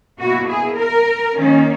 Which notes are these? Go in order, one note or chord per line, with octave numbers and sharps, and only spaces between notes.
B2 A#3 E4 F#4
G#4
A#4
D#3 A#3 C#4